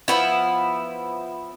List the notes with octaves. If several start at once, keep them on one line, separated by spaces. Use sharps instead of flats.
F3 B3 E4